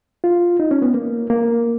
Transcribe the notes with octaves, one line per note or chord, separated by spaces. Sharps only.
F4
D#4
C#4
B3
A#3
A#3